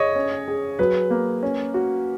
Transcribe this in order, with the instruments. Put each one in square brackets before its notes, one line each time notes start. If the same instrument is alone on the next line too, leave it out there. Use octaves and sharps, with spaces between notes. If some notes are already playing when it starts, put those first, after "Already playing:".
Already playing: [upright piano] G#4 [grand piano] C#5 D#5
[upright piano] C#4
G#4
[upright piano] F#3 [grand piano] B4
[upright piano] A#3
C#4
F#4